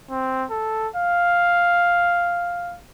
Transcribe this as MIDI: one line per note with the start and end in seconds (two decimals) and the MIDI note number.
0.10 0.45 60
0.51 0.88 69
0.96 2.76 77